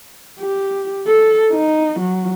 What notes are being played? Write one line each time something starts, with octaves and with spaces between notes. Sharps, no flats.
G4
A4
D#4
F#3